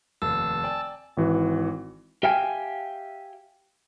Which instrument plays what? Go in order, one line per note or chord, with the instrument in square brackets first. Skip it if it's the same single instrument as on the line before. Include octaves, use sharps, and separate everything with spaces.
[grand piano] F1 D#2 [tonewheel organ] A5 [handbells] E6
[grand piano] D5 G5 G#5
[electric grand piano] G#1 E3 F#4
[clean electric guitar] G4 E5 F5 G5 G#5